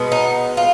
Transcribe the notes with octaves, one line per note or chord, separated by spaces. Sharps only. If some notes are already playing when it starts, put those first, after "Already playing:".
Already playing: B2 G#3 B3
D#4
F4